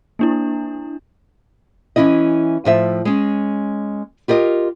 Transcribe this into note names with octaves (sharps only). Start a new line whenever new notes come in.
A#3 D4 E4
E3 C#4 E4 D#5
A2 F3 E5
G#3 C#4
F4 G4 A#4 D#5